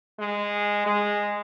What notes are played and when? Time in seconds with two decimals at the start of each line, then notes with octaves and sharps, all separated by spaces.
0.19 G#3
0.86 G#3